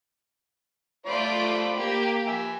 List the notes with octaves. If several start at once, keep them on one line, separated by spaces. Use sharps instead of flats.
A3 F4 C5 D5 B5 D6
A#3 G4
E5 G#5